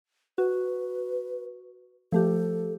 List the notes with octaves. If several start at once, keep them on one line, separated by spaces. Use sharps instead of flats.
F#4 B4
F3 A3 G4 A4